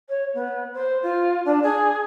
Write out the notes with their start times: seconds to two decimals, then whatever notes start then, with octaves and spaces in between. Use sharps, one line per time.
0.09 C#5
0.34 B3
0.73 C5
1.03 F4
1.45 D4
1.63 G#4